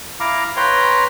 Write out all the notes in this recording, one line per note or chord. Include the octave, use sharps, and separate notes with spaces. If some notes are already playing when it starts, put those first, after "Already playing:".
E4 F5 A#5 D6
B4 C#5 G5 A#5 C6